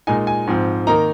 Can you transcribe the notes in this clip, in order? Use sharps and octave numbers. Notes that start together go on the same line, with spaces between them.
A#2 G#3 D#4 G#5
G#5
G#2 F3 C4
D#3 A#3 D#4 A#5